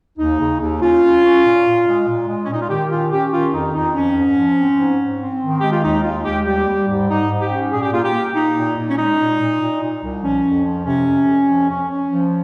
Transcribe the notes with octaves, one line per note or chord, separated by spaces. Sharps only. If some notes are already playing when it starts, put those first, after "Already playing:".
D#2 D#4
C#3
D#2
C#4 F4
C#4
C#4
A#2
A#2
G#3
A#2
G#3
C#4
A#2 D#4
F4
D#3 G4
C#4 F4
C#4 G4
D#3 F4
F2 D#4
F2 D#4
F3 C#4
G#2
F3
C4
G#2
G#2
C4
D#3
G#3 G4
F4
D#2 D#4
G#3 F4
D#2 G4
G3 G4
G3
G#2
G#2 D#4
G#2
G4
C#4
A#2 G#4
G4
A#3 F4
G4
A#3
A#3 D#4
A#2
A#2
C#4
G#3 D#4
A#2
A#2
A#2
A#2
C2
F3 C#4
F2
F3
C3 C#4
F2
F2
F3
C#4
C#4
F3